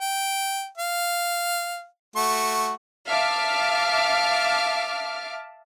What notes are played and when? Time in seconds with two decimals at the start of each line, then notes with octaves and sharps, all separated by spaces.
0.01 G5
0.78 F5
2.16 A3 F#4 C#6
3.08 E5 F5 A5 D6 F6